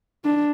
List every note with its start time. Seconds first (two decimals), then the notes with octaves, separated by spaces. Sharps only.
0.25 D4